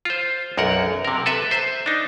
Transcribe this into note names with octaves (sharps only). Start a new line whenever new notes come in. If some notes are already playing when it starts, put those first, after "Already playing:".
F4 C5
B1 F#2 A#4 F#5
C3 A#4
A4 B4 E5
C5 E5
D4 D#4